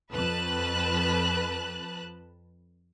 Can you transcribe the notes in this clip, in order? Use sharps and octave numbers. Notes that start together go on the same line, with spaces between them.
F2 B4 A5 F#6